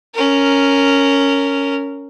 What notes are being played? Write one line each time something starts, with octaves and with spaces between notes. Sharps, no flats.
C#4 A#4